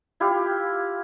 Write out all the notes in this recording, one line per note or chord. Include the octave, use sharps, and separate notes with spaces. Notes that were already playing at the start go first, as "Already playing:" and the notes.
E4 F4 G4